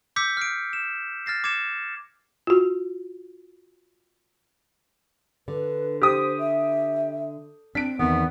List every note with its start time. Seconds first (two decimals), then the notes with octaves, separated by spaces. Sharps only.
0.16 D6 E6 G6 B6 C#7
0.37 F6 C7 D7
0.73 E7
1.26 F6 A6 A#6 C7
1.44 D6 G#6 C#7 E7
2.47 F4 F#4
5.48 D3 B4
6.02 G4 C5 D#6
6.39 E5
7.75 C4 D4 B6 D7
7.99 E2 D#3 B3